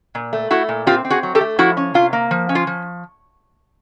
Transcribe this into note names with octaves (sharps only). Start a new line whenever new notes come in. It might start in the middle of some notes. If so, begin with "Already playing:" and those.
A#2
A3
A3 E4 F#4
A#2
C4 F4 G4
C4
F#4 G#4
F#3
G4 A4
A3
F3 E4 F#4
C#4
C3 F4
A#3
F3
C#4
F4
F3